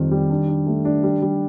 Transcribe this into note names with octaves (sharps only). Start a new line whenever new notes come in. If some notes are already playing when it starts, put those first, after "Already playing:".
Already playing: F2 D#3 G3 C4
G3
D4
D4
A3
D4
G3
G3